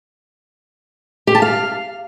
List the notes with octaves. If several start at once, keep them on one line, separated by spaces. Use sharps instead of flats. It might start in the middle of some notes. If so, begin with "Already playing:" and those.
G4
A5
F5